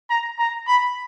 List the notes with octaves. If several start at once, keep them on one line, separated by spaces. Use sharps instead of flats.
A#5
A#5
B5